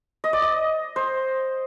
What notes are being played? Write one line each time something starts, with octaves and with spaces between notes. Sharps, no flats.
D#5
D5
D#5
C5